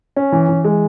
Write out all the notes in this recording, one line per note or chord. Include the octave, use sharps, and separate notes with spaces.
C#4
E3
E3
G#3